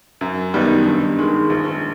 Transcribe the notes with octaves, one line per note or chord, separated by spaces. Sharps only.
F#2
D#3 G3 B3 D#4
G2
D#3 G#3
A#1